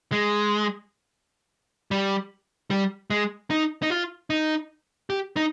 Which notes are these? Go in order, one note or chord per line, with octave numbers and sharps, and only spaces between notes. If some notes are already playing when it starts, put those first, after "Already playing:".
G#3
G3
G3
G#3
D#4
D#4
F4
D#4
G4
D#4